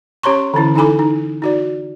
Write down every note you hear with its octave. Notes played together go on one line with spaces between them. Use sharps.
C#4 G4 C#5 A#5 C6 C#6
D3 E3 C#4 E4
D#4 E4 A4 G#5 B5 D6
D#4
D#4 F#4 D5